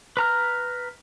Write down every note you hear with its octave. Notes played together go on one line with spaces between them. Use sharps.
B4 A#5 F6